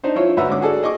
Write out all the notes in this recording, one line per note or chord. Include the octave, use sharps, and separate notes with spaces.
D4 D#4 C5
F3 E4 F4 C#5
D2 B4 E5 F#5 A#5
G#2 D3 C#4 D6
F#4 G#4 A4 D5
G#4 D#5 C#6 D6